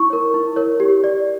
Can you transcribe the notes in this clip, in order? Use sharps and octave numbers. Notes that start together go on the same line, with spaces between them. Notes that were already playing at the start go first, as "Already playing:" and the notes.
Already playing: E4 C#6
A#4 C#5
E4
A#4 C#5
G4
D5